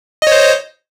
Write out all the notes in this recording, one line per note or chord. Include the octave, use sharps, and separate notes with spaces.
C5 C#5 D#5